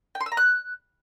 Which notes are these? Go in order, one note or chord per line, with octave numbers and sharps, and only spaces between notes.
G5
C6
E6
A#5
F#6